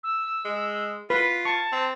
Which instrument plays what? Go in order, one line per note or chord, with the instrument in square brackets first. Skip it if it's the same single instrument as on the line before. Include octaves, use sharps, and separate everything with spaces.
[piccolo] E6
[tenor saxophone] G#3
[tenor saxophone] F4 [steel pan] B4 [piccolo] B6
[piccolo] A5 [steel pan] C#6
[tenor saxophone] C4